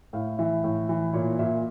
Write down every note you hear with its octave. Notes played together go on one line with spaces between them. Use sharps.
A2 F5
E3 E5
A2
E3
A#2 C#5
A#2 E5